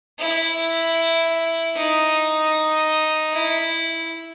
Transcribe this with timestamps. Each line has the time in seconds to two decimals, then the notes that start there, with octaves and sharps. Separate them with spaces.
0.19 E4
1.76 D#4
3.33 E4